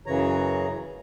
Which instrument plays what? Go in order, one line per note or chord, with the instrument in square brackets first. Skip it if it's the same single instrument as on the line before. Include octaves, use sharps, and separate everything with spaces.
[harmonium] F#2 C#3 E3 C#5 A#5